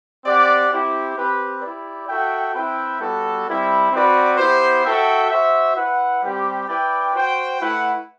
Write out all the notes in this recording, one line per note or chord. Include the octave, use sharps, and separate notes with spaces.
C4 G4 D5 F#5
C4 E4 G4
C4 G4 B4
E4 G4 D5
F#4 A4 E5 G5
C4 E4 B4 E5 G5
G3 B3 F#4 A4
G3 C4 E4
C4 F#4 B4 D5
B3 E4 G4 C5
F#4 A4 E5 G5
F#4 C5 E5
E4 B4 F#5
G3 C4 G4
E4 B4 D5 G5
F#4 C5 G5
A3 E4 B4 F#5